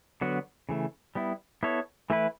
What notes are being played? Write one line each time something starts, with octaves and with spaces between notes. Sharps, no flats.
D3 F#3 B3 F#4
C#3 E3 A3
G3 B3 E4
B3 E4 A4 C#5
E3 A3 E4 B4